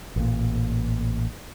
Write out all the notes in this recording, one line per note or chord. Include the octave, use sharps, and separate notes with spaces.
A1 A#2